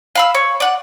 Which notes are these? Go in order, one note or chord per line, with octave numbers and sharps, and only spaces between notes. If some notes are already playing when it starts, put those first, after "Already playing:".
F5 B5 E6
C#5
D5 F#5